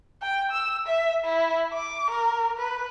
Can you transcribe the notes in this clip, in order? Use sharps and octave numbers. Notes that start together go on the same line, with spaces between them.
G5
E6
E5
E4
D6
A#4
B4